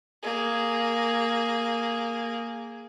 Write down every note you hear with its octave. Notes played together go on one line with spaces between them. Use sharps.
A#3 G#4